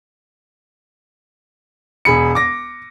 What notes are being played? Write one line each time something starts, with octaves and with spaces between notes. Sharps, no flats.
E1 G#4 B5 C#7
D6 A#6